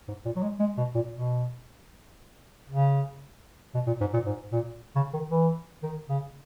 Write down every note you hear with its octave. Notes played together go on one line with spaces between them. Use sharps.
G#2
A#2
F#3
G#3
G#3
B2
A#2
B2
C#3
B2
A#2
G#2
A#2
G#2
A#2
C#3
D#3
E3
D#3
C#3